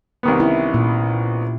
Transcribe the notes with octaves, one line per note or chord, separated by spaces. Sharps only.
C2 D#3 B3
C#4 E4
A#2